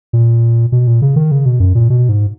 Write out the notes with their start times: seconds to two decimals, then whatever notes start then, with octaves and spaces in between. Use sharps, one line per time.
0.13 A#2
0.72 B2
0.87 A#2
1.02 C#3
1.16 D#3
1.31 C#3
1.46 B2
1.60 F#2
1.75 A#2
1.90 B2
2.09 G#2